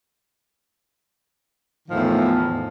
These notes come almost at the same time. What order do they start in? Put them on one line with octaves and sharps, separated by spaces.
D#3 F3 A2 E2